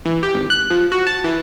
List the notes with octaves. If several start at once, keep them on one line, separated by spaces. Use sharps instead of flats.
E3
G4
G#1
F#6
F3
F#4
A5
E3